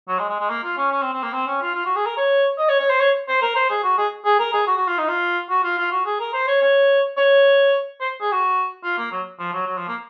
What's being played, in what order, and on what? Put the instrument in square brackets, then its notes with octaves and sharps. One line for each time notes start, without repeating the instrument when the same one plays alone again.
[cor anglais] F#3
G#3
G#3
G#3
A#3
F4
C#4
C#4
C4
C4
A#3
C4
C#4
F4
F4
F#4
G#4
A#4
C#5
D#5
C#5
C#5
C5
C#5
C5
A#4
C5
G#4
F#4
G#4
G#4
A#4
G#4
F#4
F#4
F4
D#4
F4
F#4
F4
F4
F#4
G#4
A#4
C5
C#5
C#5
C#5
C5
G#4
F#4
F4
A#3
F#3
F3
F#3
F#3
F3
A#3